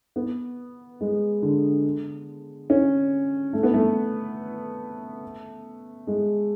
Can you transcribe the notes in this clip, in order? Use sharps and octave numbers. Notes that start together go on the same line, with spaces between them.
B3
G#3
D3
C#4
A3
B3
A3
G#3